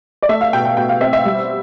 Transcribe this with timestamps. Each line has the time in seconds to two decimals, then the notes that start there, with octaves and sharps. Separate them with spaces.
0.22 D5
0.29 A3 E5
0.41 F5
0.53 B2 G5
0.65 G5
0.77 B2 G5
0.89 F5
1.01 C4 E5
1.13 E5
1.25 G3